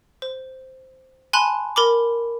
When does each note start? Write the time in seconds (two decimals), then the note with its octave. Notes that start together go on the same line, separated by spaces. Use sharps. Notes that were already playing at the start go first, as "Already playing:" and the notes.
0.22 C5
1.33 G#5 A5 B5 C6 F#6
1.76 A#4 B5 D6